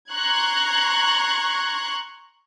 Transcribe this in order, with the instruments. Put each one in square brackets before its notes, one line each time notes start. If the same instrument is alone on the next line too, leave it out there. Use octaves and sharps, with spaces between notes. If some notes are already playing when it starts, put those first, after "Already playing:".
[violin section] A#5 C6 C#6 F#6 G#6